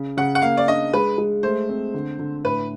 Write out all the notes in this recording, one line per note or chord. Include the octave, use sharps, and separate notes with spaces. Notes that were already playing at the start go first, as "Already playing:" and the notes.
Already playing: C#3
C#3 F#5
F#5
A#3 F5
D5
D4 D#5
G#3 B4
G#3
A3 C5
C4
D3
D3
A2 B4